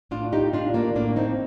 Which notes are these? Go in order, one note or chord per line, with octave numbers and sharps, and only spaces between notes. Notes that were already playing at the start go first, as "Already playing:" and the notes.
A2 D4 F4
D#4 G4
A2 D4 F4
A#3 D4
A2 A#3 D4
C4 D#4